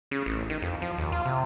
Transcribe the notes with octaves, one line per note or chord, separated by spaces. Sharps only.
C#3
A1
D#3
F2
F3
D#2
F4
C3